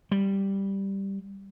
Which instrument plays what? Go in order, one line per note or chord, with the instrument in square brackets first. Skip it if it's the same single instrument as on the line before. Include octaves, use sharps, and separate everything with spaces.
[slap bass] G3